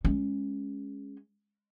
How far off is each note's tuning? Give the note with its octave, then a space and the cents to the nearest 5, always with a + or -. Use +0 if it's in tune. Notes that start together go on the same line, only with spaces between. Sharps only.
G#3 +0 C#4 +0